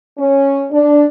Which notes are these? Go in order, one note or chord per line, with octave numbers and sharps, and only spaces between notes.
C#4
D4